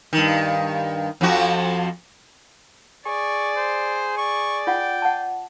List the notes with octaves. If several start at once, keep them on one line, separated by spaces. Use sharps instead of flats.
G2 D#3
F2 F3 F#4
G#4 D5 C#6
C5
D5 C#6
F4 F#5 G5
F#5 A5